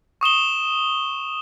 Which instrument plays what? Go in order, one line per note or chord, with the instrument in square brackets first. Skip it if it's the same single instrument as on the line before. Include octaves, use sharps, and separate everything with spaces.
[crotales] C#6 D#6 E7 G7